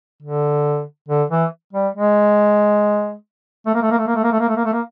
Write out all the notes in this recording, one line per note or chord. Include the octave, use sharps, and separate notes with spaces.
D3
D3
E3
G3
G#3
A3
A#3
A3
A#3
A3
A#3
A3
A#3
A3
A#3
A3
A#3
A3
A#3